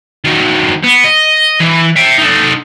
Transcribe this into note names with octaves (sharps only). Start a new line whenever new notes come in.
D#3 F#3
B3
D#5
E3
E5 G5
D#4 A4